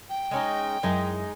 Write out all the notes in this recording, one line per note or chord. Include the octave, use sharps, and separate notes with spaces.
G5
G#3 C#4 D#4
F#2 G#3 D#4 E4 E5